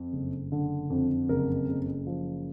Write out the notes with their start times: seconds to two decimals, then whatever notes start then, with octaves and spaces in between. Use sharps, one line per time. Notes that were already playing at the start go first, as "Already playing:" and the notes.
Already playing: F2
0.13 F#1
0.52 D3
0.90 F2
1.29 F#1 A#4
1.68 F#1
2.07 F3